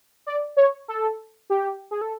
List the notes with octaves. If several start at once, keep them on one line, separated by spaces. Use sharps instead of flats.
D5
C#5
A4
G4
G#4
A4